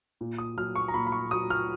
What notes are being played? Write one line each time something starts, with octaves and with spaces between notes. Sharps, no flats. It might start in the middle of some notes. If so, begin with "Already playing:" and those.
A#2
D#6
F#3 F6
C#6
A#5
A#2 B5
B5
C#6
F#3 D#6
F6